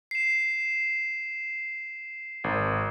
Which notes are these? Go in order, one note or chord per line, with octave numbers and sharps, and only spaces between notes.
C7 E7
G#1